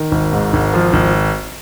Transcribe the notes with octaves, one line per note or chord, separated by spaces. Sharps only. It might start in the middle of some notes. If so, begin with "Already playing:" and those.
Already playing: D#3
G#1
G#2
G#1
F3
G#1